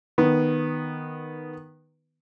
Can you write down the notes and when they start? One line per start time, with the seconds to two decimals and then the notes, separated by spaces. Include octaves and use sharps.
0.18 D#3 B3